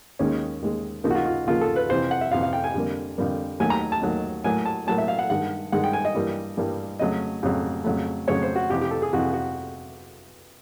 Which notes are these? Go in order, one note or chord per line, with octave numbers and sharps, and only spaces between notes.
D#2 D#3 G#3 C#4
D#2 D#3 G#3
D#2 C#3 F3 A#3 D#4
F#4
F4
F4
D#2 C#3 F3 A#3 F4
A4
B4
F2 C3 E3 C5
F#5
E5
F2 C3 E3 F5
F5
G5
G#5
F2 D3 G3 A#3
F2 D3 G3 A#3
D#2 D#3 F#3 A3 G#5
A#5
A5
D#2 D#3 F#3 A3
A2 F#3 A#3 G#5
A5
A2 F#3 A#3 A5
E5
F5
F#5
G2 D#3 G#3 F#5
G2 D#3 G#3 F#5
G5
G#5
D#5
G2 E3 G3 A#3
G2 E3 G3 A#3
F2 C#3 F#3 A3 D#5
F2 C#3 F#3 A3
F2 C#3 F#3 A3
F2 C#3 F#3 A3 C#5
C5
F#4
F2 C3 E3 G4
G4
A4
G#4
F2 C3 E3 F#4
F#4